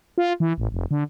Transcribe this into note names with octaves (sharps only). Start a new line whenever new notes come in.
F4
E3
A1
F1
D3